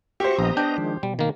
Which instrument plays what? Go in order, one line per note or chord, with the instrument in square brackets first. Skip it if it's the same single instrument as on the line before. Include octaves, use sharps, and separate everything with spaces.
[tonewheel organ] F#4 E5 C#6 [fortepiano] G4 C5
[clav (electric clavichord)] A#1 [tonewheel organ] B3 D#5 A#5
[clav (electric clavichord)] D4 G5
[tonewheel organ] D#3 F3 G#3
[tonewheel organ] B2 [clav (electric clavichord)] G3
[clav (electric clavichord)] D#3 A#3